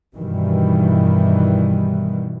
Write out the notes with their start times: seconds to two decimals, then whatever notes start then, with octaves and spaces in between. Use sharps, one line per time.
0.15 G2 B2 D#3 E3 G3